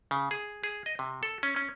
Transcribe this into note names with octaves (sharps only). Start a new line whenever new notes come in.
C#3
G#4
G#4
D#5
C3
A4
C#4
C#4